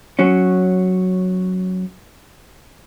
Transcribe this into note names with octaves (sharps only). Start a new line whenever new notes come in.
F#3 C#4